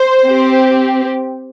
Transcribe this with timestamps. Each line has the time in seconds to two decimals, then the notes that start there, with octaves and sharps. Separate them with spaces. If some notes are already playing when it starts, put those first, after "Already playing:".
Already playing: C5
0.25 C4 G4